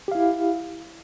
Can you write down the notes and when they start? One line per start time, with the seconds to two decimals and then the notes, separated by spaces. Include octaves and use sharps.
0.08 G4
0.12 F5
0.15 E4